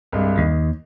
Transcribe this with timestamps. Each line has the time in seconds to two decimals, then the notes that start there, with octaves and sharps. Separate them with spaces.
0.12 C2 G2 G#3
0.38 D#2 D#5